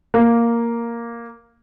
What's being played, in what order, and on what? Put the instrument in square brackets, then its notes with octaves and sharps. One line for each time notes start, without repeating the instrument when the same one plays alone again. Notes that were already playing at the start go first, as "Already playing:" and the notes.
[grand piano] A#3